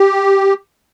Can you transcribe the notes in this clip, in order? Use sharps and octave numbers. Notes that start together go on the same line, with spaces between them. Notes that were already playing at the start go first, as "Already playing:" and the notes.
Already playing: G4